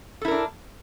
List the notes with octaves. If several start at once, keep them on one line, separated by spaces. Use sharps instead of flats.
D4 E4 A4 A#4